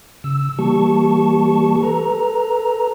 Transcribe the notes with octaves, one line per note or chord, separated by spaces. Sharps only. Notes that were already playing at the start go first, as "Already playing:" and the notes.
C#3 E6
E3 G3 A#3 G4 A5 C#6
A4 B4 A#5